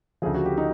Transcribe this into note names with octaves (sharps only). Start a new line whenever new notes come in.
D2 C#3 F3 G#4
F#4
G4
D#4